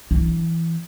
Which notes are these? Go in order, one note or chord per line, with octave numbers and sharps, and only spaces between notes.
E3